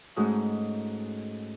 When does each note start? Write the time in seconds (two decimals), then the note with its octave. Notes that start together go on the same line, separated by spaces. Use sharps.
0.16 G#2 G#3 A3 C#4 D#4 F#4